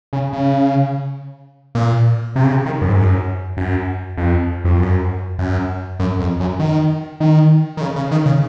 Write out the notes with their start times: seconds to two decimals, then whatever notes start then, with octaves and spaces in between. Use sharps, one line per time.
0.13 C#3
0.33 C#3
1.75 A#2
2.36 C3
2.44 C#3
2.51 C3
2.66 D#3
2.81 F#2
2.89 G#2
2.96 F#2
3.57 F#2
4.17 F2
4.65 F2
4.78 F#2
5.39 F#2
6.00 F#2
6.19 F2
6.40 F#2
6.59 D#3
7.20 D#3
7.77 D#3
7.81 C#3
7.96 C#3
8.11 D#3
8.26 C#3